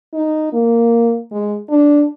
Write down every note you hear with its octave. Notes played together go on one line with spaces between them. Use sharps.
D#4
A#3
G#3
D4